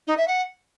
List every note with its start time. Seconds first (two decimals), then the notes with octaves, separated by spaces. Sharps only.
0.07 D#4
0.17 E5
0.27 F#5